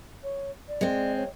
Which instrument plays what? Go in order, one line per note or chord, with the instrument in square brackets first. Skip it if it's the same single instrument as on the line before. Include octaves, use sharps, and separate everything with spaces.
[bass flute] C#5
D5
[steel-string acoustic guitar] G#3 C4
[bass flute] C#5